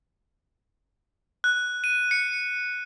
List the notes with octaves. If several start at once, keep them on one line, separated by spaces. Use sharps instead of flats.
F#6
D#7
C#7